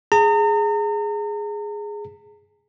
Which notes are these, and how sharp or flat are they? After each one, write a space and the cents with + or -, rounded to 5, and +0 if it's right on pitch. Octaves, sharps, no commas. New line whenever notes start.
G#4 +0 A#5 -40